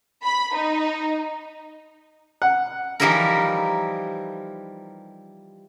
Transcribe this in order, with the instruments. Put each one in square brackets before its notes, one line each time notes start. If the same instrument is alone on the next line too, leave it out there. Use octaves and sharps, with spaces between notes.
[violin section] B5
D#4
[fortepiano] F#5
[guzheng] E3 F3 G3 D#4 E4 A#4